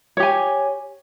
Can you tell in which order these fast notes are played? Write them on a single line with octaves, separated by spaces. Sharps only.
C#5 G4 G#5